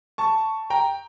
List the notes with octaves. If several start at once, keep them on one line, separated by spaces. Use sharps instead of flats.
A5 C#6
G5 A#5